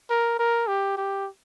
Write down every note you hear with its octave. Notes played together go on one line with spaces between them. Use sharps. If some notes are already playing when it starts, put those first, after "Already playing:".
A#4
A#4
G4
G4